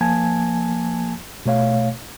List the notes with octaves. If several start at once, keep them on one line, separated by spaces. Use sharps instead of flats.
F3 A#3 G#5 A5 G#6
B2 A3 C#5 F5